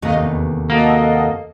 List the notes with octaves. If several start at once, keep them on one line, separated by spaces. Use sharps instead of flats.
D#2 C3 A3 D#5 F5
E2
A#3 F#4 A4 D#5